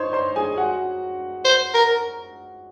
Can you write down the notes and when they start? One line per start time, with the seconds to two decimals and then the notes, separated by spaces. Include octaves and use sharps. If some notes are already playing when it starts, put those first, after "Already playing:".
Already playing: D#4 C5 C#5 C6
0.13 C5 C6
0.36 G#4 G#5
0.57 F#4 F#5
1.45 C5
1.74 A#4